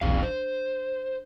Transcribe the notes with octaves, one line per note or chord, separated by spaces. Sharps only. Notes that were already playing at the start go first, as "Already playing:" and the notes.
D#1 A#1 E3 C4 F5
D4 C5